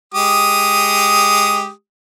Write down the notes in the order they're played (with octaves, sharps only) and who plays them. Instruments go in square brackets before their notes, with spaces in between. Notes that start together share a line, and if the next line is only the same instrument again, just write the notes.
[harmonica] G#3 G4 D#6